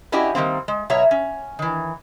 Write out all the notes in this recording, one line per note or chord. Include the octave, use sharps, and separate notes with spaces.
C#4 E4 F#4 G4 D5 D#5
D#3 G3 A#3 C4
G#3
B2 F#3 C#5 E5 A#5
C#4
D#3 E3